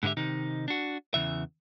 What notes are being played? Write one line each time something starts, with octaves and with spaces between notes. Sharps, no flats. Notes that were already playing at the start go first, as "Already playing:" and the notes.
G#2 D3 E4 G4 E5
C3 D#3 D#4
D4 F#4
E2 C#3 E3 E5